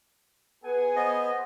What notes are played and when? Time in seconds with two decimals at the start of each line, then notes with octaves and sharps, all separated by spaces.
0.64 B3 G#4 F#5 G#5
0.96 B3 C5 D#5